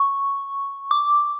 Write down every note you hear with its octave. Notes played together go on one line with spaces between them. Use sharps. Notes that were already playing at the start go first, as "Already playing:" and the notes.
Already playing: C#6
D6